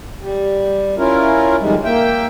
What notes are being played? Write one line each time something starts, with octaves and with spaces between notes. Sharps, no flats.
G3
C#4 E4 F4 A#4
F2 D#3 G3 G#3
A#3 E5 G5